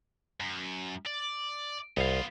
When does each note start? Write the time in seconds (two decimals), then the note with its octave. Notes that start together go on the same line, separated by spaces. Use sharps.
0.40 F#2
1.07 D5
1.97 C2 B3 F4 F5